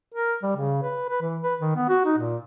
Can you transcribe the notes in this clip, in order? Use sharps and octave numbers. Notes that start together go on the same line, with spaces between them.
A#4
G3
C#3
B4
B4
E3
B4
D#3
B3
F#4
D#4
A#2